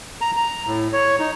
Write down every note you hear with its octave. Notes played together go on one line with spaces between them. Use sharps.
A#5
A#5
A2
C#5
D#4